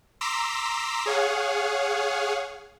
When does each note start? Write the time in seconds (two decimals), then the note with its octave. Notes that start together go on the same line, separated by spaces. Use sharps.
0.21 A#5 C6 D6 E6 B6
1.06 G#4 C#5 F5 F#5